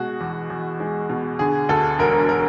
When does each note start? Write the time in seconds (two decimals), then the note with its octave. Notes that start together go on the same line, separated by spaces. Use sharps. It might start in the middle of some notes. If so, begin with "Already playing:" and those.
Already playing: B2 G#3 F#4
0.20 E2
0.50 E2
0.80 G#3
1.09 B2
1.39 D3 G#4
1.69 D2 A4
1.99 E1 A#4
2.29 A#4